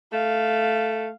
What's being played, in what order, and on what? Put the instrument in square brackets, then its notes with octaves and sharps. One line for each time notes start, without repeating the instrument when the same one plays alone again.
[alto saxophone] A3 [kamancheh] F5